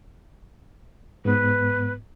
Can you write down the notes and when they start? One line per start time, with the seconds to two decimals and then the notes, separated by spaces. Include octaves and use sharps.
1.25 G#2 B3 B4